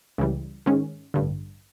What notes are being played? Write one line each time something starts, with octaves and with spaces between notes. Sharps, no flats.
C#2 C#3 E3 G3
G#2 D#3 G#3 C#4
A1 G2 D3